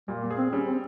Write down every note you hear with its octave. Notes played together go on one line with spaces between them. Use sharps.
A#2 G3
A#3
G#4
C4
G3 C#4
C4